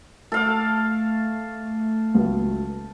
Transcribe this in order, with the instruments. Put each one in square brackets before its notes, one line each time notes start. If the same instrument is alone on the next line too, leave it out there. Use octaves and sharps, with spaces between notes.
[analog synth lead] A3 [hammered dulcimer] A4 F5 D6
[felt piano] C#2 F#3